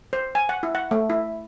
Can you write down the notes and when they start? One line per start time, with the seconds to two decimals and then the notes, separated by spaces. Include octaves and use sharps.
0.13 C5
0.35 G#5
0.49 F#5
0.63 E4
0.75 F#5
0.91 A3
1.10 E4